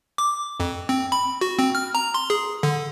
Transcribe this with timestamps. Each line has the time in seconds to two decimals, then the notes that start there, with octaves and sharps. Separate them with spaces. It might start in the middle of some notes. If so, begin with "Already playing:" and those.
0.18 D6
0.60 F2
0.89 C4
1.12 B5
1.41 F#4
1.59 C4
1.75 F6
1.95 A#5
2.14 C6
2.30 G#4
2.63 D3